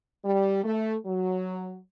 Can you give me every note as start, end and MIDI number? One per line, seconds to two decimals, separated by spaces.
0.25 0.62 55
0.64 0.95 57
1.05 1.78 54